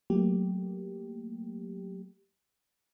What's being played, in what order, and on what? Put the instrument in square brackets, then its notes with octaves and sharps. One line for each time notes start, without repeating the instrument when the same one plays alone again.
[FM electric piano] F#3 A3 A#3 G4